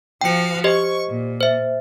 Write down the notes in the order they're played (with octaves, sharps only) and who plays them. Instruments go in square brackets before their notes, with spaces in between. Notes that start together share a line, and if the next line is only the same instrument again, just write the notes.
[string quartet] F3 F#4 F5 [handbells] G5 C#7
[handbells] G4 C5 D#5 [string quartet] C#6
[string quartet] A#2
[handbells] C5 E5